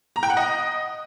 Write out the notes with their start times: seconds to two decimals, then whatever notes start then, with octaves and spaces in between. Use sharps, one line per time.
0.16 A#5
0.23 G5
0.30 F#5
0.37 D#5